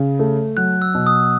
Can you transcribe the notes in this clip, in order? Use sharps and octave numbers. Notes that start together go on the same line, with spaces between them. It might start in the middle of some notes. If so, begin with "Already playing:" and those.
Already playing: C#3
A3
F#3 F#6
E6
B2
D#6